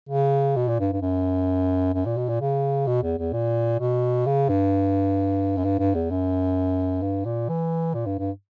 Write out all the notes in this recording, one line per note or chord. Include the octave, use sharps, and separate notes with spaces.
C#3
B2
A#2
G2
G2
F#2
F#2
A#2
B2
A#2
C#3
B2
E2
E2
A#2
B2
C#3
G2
F#2
G2
G2
E2
F#2
G2
A#2
E3
A#2
G2
G2